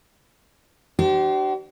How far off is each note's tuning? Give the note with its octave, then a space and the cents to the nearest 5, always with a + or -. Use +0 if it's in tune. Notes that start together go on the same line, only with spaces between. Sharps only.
D4 +35 G4 -45 C5 +0